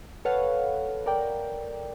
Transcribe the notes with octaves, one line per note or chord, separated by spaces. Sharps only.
A4 B4 C#5 F5 F#5
A#4 D5 G5